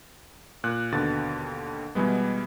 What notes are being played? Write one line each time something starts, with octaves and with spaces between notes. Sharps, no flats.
A#2 F#6
D#2 B2 D3 A6
B2 E3 G3 G#3 B3